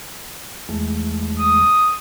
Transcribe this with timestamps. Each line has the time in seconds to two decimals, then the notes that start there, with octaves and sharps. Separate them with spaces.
0.69 E2 G#3 A3
1.39 D#6